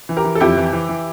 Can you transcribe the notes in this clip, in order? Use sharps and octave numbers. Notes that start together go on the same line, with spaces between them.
E3
G4 A#4
E3
A4
F2 E4 G4
E3
E3
E3